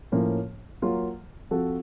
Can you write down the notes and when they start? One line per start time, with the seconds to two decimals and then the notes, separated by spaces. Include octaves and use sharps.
0.12 A2 F3 A#3 C#4
0.82 F#3 A#3 F4
1.51 F3 C4 F#4 A4